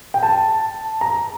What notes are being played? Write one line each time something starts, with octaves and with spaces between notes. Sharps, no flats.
G5
A5
A#5